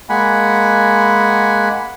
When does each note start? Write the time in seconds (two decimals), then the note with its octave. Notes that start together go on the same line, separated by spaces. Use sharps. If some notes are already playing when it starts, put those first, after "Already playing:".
0.09 G#3 A#3 F#5 G#5 B5